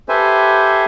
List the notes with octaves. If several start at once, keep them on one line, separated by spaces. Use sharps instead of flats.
G4 A4 B4 C5 E5 G#5